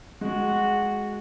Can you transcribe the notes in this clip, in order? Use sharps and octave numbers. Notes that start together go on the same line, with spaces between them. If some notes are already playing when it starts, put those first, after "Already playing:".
G#3 F#4